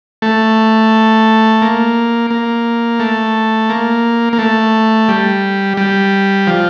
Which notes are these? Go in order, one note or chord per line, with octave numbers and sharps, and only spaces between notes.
A3
A#3
A#3
A3
A#3
A#3
A3
G3
G3
F3